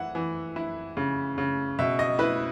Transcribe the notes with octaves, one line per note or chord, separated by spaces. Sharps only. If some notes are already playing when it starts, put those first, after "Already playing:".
Already playing: E3 E4 F#5
E3
E4
C#3
C#3
B2 E5
D#5
E4 B4